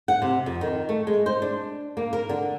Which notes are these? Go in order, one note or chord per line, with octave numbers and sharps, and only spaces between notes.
F#5
C3
F2
D#3
A3
G#3
C5
D4
A#3
A#4
D3